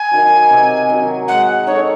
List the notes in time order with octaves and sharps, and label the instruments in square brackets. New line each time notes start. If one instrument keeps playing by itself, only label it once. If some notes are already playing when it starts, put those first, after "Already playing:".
Already playing: [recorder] G#5
[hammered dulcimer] D#3 F#3
C3
D#3 F#3
[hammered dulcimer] G#3 [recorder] F#5
[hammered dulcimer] D#4 A4 [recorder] C#5